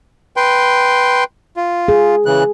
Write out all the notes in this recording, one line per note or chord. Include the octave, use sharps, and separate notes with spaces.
B4 G5 C6
F4
G#4
C#3 E3 F#6